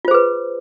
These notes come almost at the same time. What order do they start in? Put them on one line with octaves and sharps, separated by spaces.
F4 C5 G#4 B4